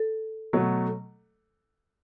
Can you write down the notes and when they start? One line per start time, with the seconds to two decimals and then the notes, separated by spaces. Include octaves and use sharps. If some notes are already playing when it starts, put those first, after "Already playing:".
Already playing: A4
0.53 B2 F#3 A3